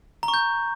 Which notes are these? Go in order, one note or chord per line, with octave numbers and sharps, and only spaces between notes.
A#5
C#6
G6